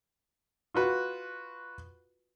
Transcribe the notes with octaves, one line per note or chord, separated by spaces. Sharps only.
F4 F#4 B4